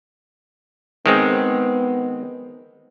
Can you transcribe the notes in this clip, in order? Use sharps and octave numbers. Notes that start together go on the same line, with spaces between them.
D#3 G#3 B3 C4